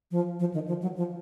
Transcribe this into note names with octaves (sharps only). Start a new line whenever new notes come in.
F3
F3
D#3
F3
F#3
F3